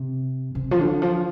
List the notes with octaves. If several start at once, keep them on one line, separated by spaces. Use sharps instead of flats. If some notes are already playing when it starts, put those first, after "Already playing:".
Already playing: C3
C3
F3
D3
F3